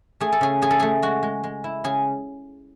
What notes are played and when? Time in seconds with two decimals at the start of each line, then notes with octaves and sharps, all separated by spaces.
0.20 A3 G#4
0.32 A4
0.41 C#3 G#4
0.62 A3 G#4
0.71 A4
0.80 A3 G#4
1.02 G#3 F#4
1.23 G#3
1.43 G#3
1.64 E4
1.84 C#3 G#4